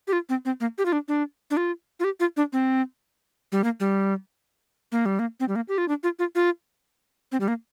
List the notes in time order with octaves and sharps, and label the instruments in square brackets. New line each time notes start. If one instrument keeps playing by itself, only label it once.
[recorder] G4
F4
C4
C4
A#3
G4
F4
D4
D4
D4
F4
F4
G4
F4
D4
C4
G3
A#3
G3
A#3
G3
A#3
C4
G3
A#3
G4
F4
D4
F4
F4
F4
C4
G3
A#3